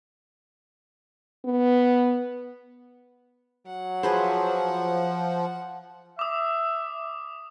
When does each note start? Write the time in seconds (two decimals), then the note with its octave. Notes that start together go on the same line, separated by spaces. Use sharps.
1.45 B3
3.66 F#3 F#5
4.03 F3 G#4 B4 C5
6.19 E5 D6 D#6